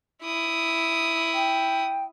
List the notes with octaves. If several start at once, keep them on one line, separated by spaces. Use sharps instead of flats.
E4 D#6
G5